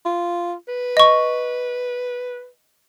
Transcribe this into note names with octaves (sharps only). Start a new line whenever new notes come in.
F4
B4
D#5 C#6